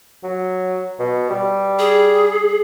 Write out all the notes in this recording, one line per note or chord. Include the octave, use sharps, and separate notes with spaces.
F#3
B2
G3
G#4